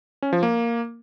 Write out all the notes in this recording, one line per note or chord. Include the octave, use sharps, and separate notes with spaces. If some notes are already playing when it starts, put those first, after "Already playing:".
C#4
F3
A#3